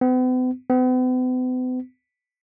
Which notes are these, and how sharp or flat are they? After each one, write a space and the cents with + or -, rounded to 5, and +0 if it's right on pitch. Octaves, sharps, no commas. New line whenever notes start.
B3 +45
B3 +45